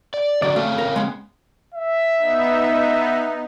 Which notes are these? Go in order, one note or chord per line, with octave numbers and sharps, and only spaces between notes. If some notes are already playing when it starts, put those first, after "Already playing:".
D5
D3 F#3 F#4 D5
A3 C4 C#4 F5
A#4
G#3 B3
E5
B3 D#4